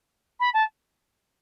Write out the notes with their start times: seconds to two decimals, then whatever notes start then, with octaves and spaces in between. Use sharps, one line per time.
0.40 B5
0.54 A5